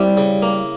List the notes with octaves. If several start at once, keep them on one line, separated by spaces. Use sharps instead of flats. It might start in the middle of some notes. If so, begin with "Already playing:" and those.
Already playing: C3 G3 E4
C#3
A#3